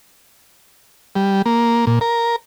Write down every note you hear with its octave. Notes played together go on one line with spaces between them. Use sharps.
G3
A#3
A#2
A#4